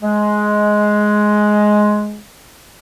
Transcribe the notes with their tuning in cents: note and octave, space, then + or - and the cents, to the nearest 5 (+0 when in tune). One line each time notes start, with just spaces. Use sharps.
G#3 +10